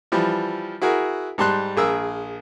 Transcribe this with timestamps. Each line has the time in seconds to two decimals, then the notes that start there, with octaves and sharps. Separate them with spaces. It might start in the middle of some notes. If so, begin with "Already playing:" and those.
0.12 E3 F3 G3
0.82 E4 F#4 G#4 A#4
1.38 G#2 G3 A5 C6 F#6
1.77 A#1 G#4 A#4 E6